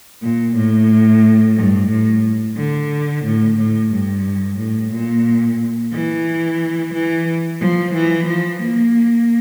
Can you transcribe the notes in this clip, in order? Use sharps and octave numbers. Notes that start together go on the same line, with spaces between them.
A#2
A2
G2
A2
D3
A2
A2
G2
A2
A#2
E3
E3
F3
E3
F3
A#3